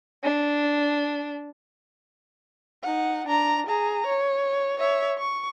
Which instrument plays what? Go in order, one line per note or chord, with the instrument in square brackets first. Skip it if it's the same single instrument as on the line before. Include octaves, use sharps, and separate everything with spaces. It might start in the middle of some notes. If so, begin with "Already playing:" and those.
[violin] D4
[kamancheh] D#4 F#5
D4 A#5
G#4 A#5
C#5
C#5 E5
C#6